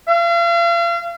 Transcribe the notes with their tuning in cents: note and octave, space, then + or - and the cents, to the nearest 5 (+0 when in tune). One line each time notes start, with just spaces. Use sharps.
F5 -40